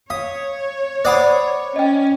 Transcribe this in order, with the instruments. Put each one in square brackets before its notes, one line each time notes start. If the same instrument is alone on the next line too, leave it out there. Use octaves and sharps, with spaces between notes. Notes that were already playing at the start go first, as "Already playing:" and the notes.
[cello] C#5 [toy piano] F5 [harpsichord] D#6
[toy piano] C5 F#5 B5 [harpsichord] D5 D6 D#6
[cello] C#4 [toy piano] D#5 G5